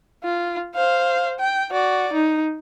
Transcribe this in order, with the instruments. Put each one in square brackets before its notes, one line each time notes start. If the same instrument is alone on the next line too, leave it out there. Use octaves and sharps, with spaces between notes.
[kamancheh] F4
C5 F5
G5
F#4 D5
D#4